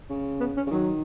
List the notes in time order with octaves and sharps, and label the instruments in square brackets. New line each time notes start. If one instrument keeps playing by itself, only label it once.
[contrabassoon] C#3
[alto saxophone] B3
C#4
[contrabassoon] C#3
[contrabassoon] D#3 [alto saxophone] F#3